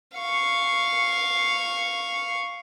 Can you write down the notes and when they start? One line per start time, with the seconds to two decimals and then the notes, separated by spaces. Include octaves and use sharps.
0.16 F5 C#6